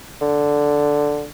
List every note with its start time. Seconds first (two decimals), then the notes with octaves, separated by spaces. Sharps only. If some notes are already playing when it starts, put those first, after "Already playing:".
0.22 D3